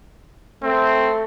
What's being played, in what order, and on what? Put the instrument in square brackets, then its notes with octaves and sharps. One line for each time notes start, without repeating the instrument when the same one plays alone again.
[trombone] A3 [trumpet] C4